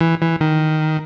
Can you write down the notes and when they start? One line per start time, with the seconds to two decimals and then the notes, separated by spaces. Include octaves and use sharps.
0.01 E3
0.21 E3
0.41 D#3